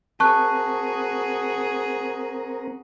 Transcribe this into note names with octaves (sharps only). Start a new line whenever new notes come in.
C4 F#4 G#4 A#4 A5 C#6 F#6